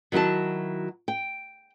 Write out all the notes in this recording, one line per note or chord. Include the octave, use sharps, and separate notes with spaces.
D#3 F#3 E4 F#4 A5
G5